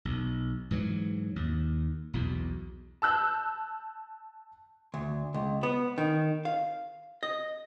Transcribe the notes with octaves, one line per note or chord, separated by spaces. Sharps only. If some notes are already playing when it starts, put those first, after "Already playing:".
B1
G#2 E3 F#3
D#2
B1 E2 B2
A5 E6 F#6 G6
D2
C#2
B3
D#3
F5
D#5